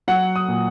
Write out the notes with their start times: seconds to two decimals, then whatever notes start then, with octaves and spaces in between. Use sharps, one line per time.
0.08 F#3 F#5
0.36 D#6
0.48 A#2